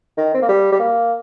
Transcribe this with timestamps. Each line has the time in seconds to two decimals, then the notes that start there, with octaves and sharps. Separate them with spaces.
0.17 D#3
0.34 C4
0.42 A#3
0.49 G3
0.72 G3
0.80 A#3